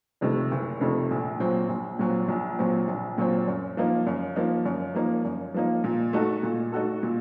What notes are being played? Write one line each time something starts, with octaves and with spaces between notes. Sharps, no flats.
F2 C3 D#3 A3
F#1
F2 C3 D#3 A3
A#1
A#2 F#3 C4
A#1
A#2 F#3 C4
A#1
A#2 F#3 C4
A#1
A#2 F#3 C4
F#2
F3 A#3 D#4
F#2
F3 A#3 D#4
F#2
F3 A#3 D#4
F#2
F3 A#3 D#4
A#2
A3 D#4 F#4 A4
A#2
A3 D#4 F#4 A4
A#2